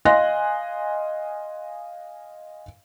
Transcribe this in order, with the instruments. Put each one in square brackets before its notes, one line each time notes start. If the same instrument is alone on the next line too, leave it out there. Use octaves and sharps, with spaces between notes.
[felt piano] D#5 F5 G#5 C6 F#6 A#6